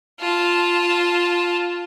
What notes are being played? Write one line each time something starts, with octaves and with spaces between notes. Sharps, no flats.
F4 A5